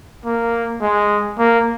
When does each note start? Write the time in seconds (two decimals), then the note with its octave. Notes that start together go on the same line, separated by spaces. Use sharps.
0.25 A#3
0.82 G#3
1.38 A#3